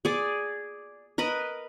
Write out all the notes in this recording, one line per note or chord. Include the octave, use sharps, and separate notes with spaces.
G#4 D5
A#4 B4 D#5 B5